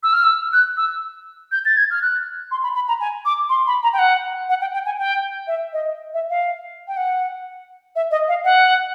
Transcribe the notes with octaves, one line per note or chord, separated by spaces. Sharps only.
E6
F6
E6
F#6
E6
G6
A6
G#6
F6
F#6
C6
B5
B5
A#5
G#5
D6
C6
B5
A#5
G5
F#5
F#5
G5
G5
G#5
G5
E5
D#5
E5
F5
G5
F#5
E5
D#5
F5
F#5